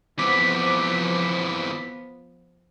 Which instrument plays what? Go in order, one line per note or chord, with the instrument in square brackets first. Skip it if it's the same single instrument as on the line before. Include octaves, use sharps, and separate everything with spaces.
[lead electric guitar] E3 C4 [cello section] F3 B3 [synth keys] D6 B6